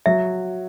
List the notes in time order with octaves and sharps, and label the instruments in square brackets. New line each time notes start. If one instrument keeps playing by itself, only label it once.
[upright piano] F#3 [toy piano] E5